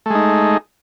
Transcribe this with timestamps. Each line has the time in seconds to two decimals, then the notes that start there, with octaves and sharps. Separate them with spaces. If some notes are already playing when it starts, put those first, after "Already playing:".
0.06 A3
0.10 G#3
0.15 D#4